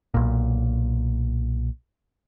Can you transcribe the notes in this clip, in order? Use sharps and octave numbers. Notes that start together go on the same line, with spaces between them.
B1 A#2